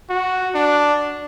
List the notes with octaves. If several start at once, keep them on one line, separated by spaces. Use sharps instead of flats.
F#4
D4